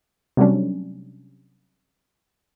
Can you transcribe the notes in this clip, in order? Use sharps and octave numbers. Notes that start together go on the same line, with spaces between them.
C3 F#3 G3 A3 C#4 D4